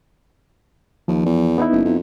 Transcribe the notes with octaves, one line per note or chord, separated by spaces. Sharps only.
D#2 F3
E2
B3 D#4 E4
F#1
F2